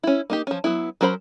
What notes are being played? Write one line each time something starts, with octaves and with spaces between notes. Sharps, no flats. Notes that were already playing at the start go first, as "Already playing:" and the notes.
C#4 E4
A#3 D#4 G4
F3 C#4
F#3 B3 E4
F#3 C#4 A#4 C5 B5